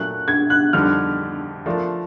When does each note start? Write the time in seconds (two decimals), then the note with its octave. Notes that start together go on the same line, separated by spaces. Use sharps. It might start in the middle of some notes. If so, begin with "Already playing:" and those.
Already playing: A#2 F#3 A3 F#6
0.28 G#6
0.50 F#6
0.73 F2 D3 G3 C4 D#4 F6
1.66 F3 A3 D4 F4 A#4